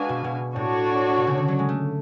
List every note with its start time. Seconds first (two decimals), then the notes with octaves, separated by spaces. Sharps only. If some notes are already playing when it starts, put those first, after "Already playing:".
Already playing: G#3 D4 F#4 B4 F5 G#5
0.09 B2
0.24 B2
0.56 A2 D4 F#4 C#5
1.17 B2
1.27 C#3
1.37 D3
1.48 F#3
1.59 G#3
1.69 A3